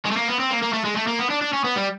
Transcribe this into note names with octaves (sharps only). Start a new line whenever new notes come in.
G#3
A3
A#3
B3
C4
A#3
A#3
A3
G#3
A3
A#3
B3
D4
D4
C#4
B3
G3